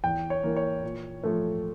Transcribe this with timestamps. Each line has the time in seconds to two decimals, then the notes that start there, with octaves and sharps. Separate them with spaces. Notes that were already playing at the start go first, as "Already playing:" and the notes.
0.04 E2 G5
0.30 C#5
0.43 E3 A#3
0.56 C#5
0.83 A#2
1.24 F3 A3